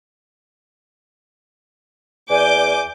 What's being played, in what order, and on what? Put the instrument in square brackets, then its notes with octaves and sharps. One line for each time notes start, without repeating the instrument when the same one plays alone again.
[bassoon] E2 [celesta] D5 [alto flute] G#5 [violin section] D6 G6